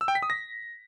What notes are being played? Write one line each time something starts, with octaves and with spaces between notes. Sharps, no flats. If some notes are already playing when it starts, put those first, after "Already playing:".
E6
G5
B6
D#6
A#6